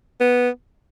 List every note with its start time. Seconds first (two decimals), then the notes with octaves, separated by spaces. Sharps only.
0.21 B3